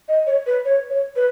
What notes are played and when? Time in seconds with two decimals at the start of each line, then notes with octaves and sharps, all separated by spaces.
0.08 D#5
0.27 C#5
0.46 B4
0.65 C#5
0.90 C#5
1.16 B4